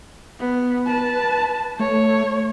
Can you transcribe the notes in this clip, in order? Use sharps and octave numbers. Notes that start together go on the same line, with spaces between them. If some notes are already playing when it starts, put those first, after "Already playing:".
B3
B4 A5
A3 C#5